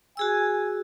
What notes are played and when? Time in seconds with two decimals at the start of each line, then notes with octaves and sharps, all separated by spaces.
0.17 F#4 G#4 G#5 E6